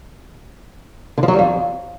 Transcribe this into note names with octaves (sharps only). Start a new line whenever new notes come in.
D3
F3
F#3
G3
F2